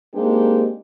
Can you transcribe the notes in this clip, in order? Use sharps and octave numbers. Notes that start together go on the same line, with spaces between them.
G#3 A#3 C4 D4 D#4 G4